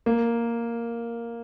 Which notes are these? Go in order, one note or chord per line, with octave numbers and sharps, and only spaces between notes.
A#3